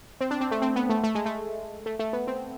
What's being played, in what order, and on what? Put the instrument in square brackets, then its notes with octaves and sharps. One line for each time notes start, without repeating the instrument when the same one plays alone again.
[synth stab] C4
D4
C4
A3
C4
B3
A3
A3
G#3
A3
A3
A3
B3
C4